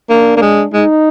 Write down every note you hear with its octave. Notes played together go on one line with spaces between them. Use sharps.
A#3 D4
A#3
G#3
G#3 D#4